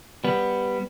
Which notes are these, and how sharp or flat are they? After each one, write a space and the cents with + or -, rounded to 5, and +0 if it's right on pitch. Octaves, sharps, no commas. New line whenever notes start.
G3 +5 B3 +0